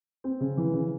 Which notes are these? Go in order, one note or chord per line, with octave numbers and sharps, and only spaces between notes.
C4
C#3
E3
C#3